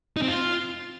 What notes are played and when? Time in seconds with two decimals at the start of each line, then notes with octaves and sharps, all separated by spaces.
0.17 D#4
0.22 C4
0.28 F4